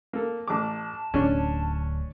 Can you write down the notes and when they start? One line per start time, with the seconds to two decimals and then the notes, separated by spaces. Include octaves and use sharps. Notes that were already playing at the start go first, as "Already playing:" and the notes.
0.13 A#3 A4
0.48 A1 A5 D6
1.14 D1 D3 C#4 D4